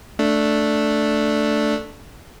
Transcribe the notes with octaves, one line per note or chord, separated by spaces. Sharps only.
A3 D4